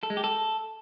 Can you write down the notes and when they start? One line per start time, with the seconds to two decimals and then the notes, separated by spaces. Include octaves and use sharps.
0.03 A4
0.10 G#3
0.17 G4
0.24 A4